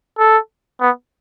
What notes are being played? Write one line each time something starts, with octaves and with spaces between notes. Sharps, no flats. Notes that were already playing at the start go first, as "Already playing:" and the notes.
A4
B3